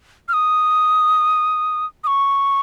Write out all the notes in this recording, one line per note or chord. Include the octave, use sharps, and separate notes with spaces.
F6
D#6
D#6
C#6